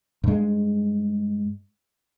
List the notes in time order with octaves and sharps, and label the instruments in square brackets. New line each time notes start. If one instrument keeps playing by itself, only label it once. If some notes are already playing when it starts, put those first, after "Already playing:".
[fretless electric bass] G2 G#3